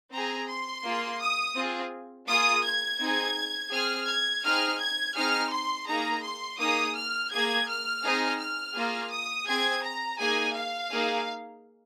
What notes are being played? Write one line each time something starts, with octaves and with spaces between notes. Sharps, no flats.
C4 G#4 A#5
C6
A#3 F4 G#4
D#6
C4 F4 G#4
A#3 F4 G#4 D#6
G#6
C4 D#4 G#4
C4 G#4 F6
G#6
C4 D#4 G#4 F6
G#6
C4 D#4 G#4 F6
C6
A#3 D#4 G#4 A#5
C6
A#3 D#4 G#4 D#6
F6
A#3 G#4 G#6
F6
C4 D#4 G#4
F6
A#3 F4 G#4
D#6
C4 G#4 G#6
A#5
A#3 D#4 G#4 G#5
F5
A#3 D#4 G#4